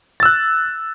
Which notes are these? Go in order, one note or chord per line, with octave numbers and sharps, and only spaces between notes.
E6 F#6 A6